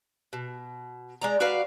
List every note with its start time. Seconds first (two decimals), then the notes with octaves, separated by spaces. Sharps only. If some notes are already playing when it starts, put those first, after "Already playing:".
0.33 B2
1.22 G#3 D5 A#5
1.40 F#4 B4 D5 F5